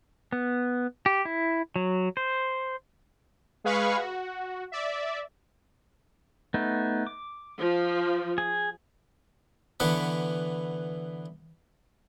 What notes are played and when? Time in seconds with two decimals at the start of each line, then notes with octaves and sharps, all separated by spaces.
0.32 B3
1.06 G4
1.25 E4
1.76 F#3
2.17 C5
3.64 G#3 G#4 B4 F5 B5 C#6
3.97 F#4
4.72 D5 E5
6.54 A3 B3 D#4
7.07 D6
7.59 F3
8.38 G#4
9.80 D3 E3 B3 F#5 B5